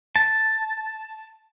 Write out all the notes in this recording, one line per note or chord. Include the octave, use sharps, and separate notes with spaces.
A5